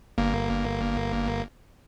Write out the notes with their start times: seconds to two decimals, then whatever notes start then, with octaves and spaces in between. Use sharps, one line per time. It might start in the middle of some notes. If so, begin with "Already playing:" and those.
0.18 G1 A#3